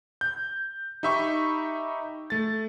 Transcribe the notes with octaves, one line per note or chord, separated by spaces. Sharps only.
G6
D#4 G4 E5 B5 C#6
A3 A6